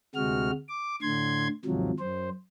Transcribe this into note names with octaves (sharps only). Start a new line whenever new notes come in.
D2 C3 G#3 F#4 F6
D6
A2 D3 C6 G#6
D#2 G#2 C3 F3 F#3
F#2 C5